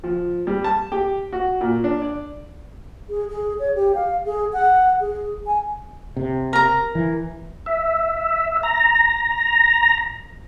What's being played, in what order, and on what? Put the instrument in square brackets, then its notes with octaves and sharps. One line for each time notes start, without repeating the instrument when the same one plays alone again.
[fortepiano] F3
G3
A5
G4
F#4
A#2
D4
D5
[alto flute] G#4
G#4
C#5
G4
F5
G#4
F#5
G#4
G#5
[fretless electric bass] C3
[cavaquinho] A#4 A#5
[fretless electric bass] E3
[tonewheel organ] E5
A#5